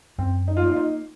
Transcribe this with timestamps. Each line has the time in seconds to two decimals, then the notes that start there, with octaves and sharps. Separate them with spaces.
0.18 F#2 C4
0.48 D#4
0.57 F4
0.62 A#3 D#4
0.72 F4
0.76 D#4